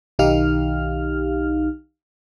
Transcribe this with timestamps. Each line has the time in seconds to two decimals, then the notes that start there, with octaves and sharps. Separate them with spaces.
0.19 B1 D#3 D#4 G4 F5 F6